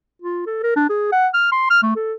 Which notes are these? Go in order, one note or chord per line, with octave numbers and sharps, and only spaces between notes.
F4
A4
A#4
D4
G#4
F#5
F6
C6
F6
A3
A4